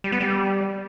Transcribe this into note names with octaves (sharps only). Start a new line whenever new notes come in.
G3
B3
G3